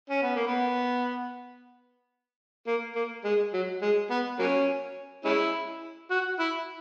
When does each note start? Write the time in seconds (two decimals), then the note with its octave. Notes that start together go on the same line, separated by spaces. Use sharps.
0.10 C#4
0.23 B3
0.36 A#3
0.47 B3
2.67 A#3
2.96 A#3
3.24 G#3
3.54 F#3
3.82 G#3
4.11 B3
4.39 F#3 A#3 C#4
5.25 G#3 C#4 E4
6.11 F#4
6.39 E4